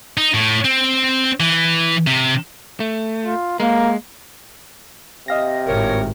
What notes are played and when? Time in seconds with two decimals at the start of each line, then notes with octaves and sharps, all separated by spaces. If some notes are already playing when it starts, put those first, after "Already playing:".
0.17 D#4
0.34 A2
0.65 C4
1.40 E3
2.07 C3
2.80 A3
3.26 F4
3.60 G#3 A#3 A#4
5.28 C3 D#5 F5 A#6
5.67 G#1 A2 A#4 C#5